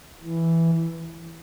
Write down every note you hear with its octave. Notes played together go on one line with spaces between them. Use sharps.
E3